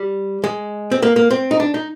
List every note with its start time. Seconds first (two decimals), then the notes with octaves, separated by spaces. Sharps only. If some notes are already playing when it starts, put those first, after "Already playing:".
Already playing: G3
0.44 G#3
0.91 C4
1.02 A#3
1.16 A#3
1.31 C4
1.51 D#4
1.60 D4
1.74 D#4